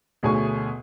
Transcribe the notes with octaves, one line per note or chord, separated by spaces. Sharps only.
D2 B2 G#4 C#5 G#5 C#6